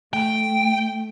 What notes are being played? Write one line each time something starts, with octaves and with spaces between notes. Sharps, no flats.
A3 G5